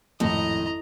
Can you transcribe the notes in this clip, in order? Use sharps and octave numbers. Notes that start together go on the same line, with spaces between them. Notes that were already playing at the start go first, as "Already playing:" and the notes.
G#1 F2 A2 D#5 A#5